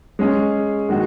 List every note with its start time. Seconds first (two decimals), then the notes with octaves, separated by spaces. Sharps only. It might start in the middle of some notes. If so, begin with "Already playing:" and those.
0.19 G#3 C#4 G#4
0.89 D#3 G#3 F#4